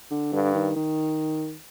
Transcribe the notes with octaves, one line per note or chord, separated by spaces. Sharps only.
D3
G2 D3
D#3
D#3